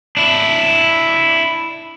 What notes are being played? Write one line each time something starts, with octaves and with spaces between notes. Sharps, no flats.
D4 E4